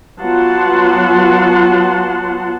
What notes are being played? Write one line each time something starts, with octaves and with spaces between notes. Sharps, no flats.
F#3 B3 F4 F#5 A5 C6